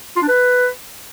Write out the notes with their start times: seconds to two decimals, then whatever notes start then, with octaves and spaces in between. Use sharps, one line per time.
0.16 F4
0.23 D4
0.29 B4